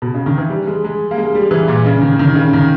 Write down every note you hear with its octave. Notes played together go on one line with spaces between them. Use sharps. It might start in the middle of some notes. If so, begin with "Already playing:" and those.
B2
C#3
D#3
E3
G3
G#3
G#3
A#3
G#3
G3
E3
A#2
C#3
D#3
D#3
C#3
D#3